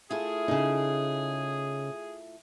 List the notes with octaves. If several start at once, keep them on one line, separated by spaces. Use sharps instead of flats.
A3 E4 F4 G#4
C#3 D#4